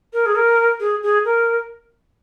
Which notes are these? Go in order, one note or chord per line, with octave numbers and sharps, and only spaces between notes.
A#4
G#4
A#4
G#4
G#4
A#4